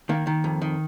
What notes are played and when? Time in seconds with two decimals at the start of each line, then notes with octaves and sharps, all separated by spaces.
0.09 D#3 A#3
0.27 D#3
0.44 F2
0.62 D#3